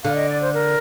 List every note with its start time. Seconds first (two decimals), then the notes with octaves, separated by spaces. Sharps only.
0.04 D3 F5
0.16 D#5
0.29 D5
0.41 C5
0.54 A#4